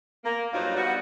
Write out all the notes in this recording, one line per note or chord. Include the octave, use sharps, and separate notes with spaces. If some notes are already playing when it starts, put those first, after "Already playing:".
A#3
G2 F3 F#3 D#4 F5
G3 B3 F#4